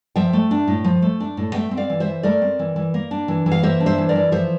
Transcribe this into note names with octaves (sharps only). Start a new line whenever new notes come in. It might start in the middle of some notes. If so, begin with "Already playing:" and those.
F3 E5 G5
A3
D4
A2
F3
A3
D4
A2
A3 E5 G5
C4
D5 F5
E3
C5 E5
E3
A3 A#4 D5
C4
E3
E3
A#3
D4
E3
E3
F5
A#3 C5 E5
D4
C5 E5
E3
A#4 D5
E3
F3 C5 E5